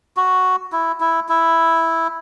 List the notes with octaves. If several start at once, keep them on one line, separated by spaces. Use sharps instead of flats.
F#4
E4
E4
E4